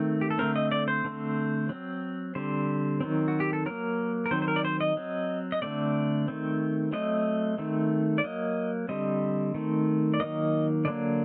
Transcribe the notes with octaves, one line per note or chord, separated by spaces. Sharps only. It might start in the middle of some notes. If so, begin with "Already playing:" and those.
Already playing: D#3 A3 C4
G4
A4
D3 A3 C4 A#4
D#5
D5
C5
D3 A3 C4
F#3 C4
D3 G3 C4 C5
D#3 F#3 C4
F#4
G4
A4
F#3 A#3 A#4
A#4
D#3 F#3 C4 C5
C5
A#4
D5
C5
D#5
F#3 C4
D#5
D3 A3 C4 D5
D#3 A3 C4
F#3 A3 C4 D#5
D#3 A3 C4
D5
F#3 A#3 D#5
D3 G3 C4 D#5
D#3 A3 C4
D5
D#3 F#3 A#3 D#5
D3 F#3 A#3 D5